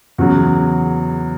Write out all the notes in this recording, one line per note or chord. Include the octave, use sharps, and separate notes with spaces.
E2 C#3 F#3 F#4